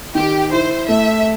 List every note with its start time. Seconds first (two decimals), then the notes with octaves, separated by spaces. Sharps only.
0.15 D#3 G4
0.52 E4 C5
0.89 A3 E5